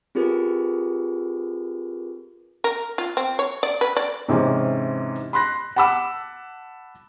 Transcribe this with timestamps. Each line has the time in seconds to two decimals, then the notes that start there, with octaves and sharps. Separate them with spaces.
0.15 C4 F4 G4 G#4 A#4 B4
2.64 A#4
2.98 F4
3.17 C4
3.39 C#5
3.63 D5
3.81 B4
3.97 D5
4.28 G#2 C3 E3 C#4
5.33 B5 C6 F#6 A#6
5.76 F#5 A5 B5 D6 E6